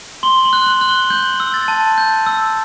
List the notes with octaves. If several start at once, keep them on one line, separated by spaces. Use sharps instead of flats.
C6 G7
F#7
F#6
F#7
F#6
G7
G6 F#7
E6
A6
A5
G6
E6